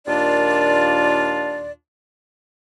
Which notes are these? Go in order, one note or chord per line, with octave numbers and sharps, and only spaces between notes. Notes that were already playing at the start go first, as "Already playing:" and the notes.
D#2 A#2 D4 F4 D5